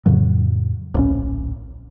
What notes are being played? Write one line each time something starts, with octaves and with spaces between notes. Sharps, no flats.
F2 A2 C#3 F#3
D1 A#1 C#4